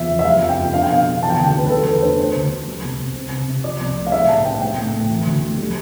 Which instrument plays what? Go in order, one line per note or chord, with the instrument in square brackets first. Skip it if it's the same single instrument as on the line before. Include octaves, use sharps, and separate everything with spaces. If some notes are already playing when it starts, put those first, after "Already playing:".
Already playing: [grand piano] E2 F3 E5
C4
E5
G3 F5
F2
G5
F2
D4 F5
G5
B2 F5
B2
E3 A5
G5
A5
D2
G5
D2 B4
B4
G3 A4
E2 B4
D4 C5
A3 C5
D2
C4
G3
C2
C2
C4
C3
C3
F3 D5
C2
A3
F5
G3 E5
A2 A5
C4 G5
G3 G5
A2
A2
E3
D2
A3
G3